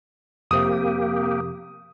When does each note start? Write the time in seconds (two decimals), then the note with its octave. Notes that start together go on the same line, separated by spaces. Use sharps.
0.51 F2 C3 A#3 G4 D#6